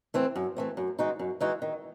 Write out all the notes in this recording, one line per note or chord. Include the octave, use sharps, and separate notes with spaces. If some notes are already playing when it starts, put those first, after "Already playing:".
E3 A3 C4
F#2
E3 A3 C4
F#2
E3 G#3 D#4 F#4
F#2
E3 G#3 D#4 F#4
D#3